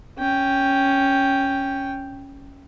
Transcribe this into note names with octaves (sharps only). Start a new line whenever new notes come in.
C#4 G5